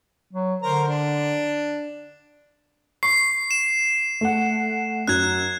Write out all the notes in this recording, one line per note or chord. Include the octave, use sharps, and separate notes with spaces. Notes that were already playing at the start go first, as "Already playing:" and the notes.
F#3
D3 A#4 C5 A#5
D4
C#6 C7
E7
A3 F#5
F#2 F#6 G#6